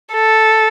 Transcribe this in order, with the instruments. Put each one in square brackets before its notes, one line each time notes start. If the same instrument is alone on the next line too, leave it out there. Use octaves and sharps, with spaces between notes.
[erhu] A4